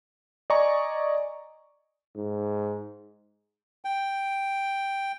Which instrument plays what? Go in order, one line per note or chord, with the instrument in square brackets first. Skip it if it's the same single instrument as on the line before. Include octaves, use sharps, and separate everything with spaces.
[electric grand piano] D5 D#5 G#5 A#5 C#6
[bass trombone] G#2
[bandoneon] G5